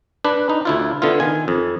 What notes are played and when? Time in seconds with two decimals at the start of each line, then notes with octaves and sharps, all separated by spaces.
0.25 D4 B4
0.49 D#4
0.65 D2 E4 F4
1.02 D3 B3 E4 F4
1.20 D#3 G#5
1.48 F2